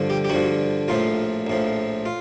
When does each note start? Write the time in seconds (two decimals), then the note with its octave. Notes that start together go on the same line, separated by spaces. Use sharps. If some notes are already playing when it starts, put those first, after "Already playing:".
Already playing: G2 D3 F3
0.10 G4
0.25 G4
0.29 G2 D3 F3 F#4
0.88 A#1 A2 F3 F4
1.47 A#1 A2 F3
2.06 F4